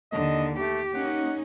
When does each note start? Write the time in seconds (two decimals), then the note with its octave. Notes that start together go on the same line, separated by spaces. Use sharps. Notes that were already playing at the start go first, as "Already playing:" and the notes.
0.12 D#2 D3 D#5
0.59 A3 G4
0.94 A#3 C#4 D#4 F#5